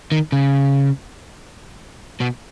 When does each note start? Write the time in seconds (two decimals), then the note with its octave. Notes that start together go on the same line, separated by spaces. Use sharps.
0.12 D#3
0.32 C#3
2.21 B2